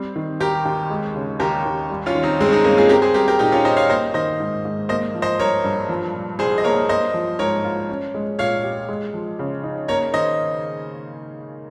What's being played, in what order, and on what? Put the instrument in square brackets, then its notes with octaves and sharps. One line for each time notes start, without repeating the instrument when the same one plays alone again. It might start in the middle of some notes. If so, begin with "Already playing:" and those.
Already playing: [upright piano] G3 C4
D#3
[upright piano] D#2 [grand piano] G4 A#4
[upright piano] D#2
G#3
C#3
[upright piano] D#2 [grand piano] G4 A#4
[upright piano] D#2
G3
[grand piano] C#4 F4
[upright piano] D#3
[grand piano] C4 D#4
[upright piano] G2 [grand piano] G#3 C4
[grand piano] C#4
C4 D#4
[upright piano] G2 [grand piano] A#3 C#4
[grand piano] F4 G#4
[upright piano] C4 [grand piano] G4 A#4
[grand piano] G#4 C5
[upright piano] G3 [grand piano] G4 A#4
[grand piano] G4 A#4
[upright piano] A#2 [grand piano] D#4 G4
[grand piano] C#4 F4
[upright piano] D#4 [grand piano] C5 D#5
[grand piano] C#5 F5
[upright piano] A#3 [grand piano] C5 D#5
[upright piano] D#3 [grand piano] C5 D#5
[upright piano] G#2
G#2
[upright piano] A#3 [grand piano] C5 D#5
[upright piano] F3
[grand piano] C5 D#5
[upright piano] G2 [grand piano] A#4 C#5
[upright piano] G2
F3
A#2
[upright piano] C2 [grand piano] G#4 C5
[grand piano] D#5
[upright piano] A#3 [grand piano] A#4 C#5
[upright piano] A#3 [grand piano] C5 D#5
[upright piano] F3
[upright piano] G#2 [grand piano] A#4 C#5
[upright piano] F4
C#4
G#3
[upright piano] A#2 [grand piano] C#5 F5
[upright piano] G4
G#3
F3
C#3
D#4
[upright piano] A#3 [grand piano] A#4 C#5
[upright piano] D#3 [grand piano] C5 D#5